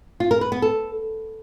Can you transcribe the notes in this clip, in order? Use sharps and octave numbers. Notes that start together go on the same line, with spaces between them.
F4
A#4
B4
B3
A4